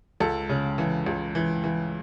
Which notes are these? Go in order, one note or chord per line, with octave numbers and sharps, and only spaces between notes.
C#2 A4
C#3
E3
C#2
E3
E3